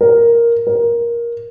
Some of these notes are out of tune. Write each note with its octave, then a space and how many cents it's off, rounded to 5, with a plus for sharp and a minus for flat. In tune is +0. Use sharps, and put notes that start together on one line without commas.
A#4 +5
A#4 +15